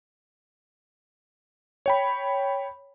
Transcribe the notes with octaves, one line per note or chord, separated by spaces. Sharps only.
C#5 G5 B5